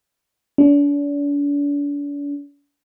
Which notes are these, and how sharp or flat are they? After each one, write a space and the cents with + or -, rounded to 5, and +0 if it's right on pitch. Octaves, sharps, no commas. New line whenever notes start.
D4 -40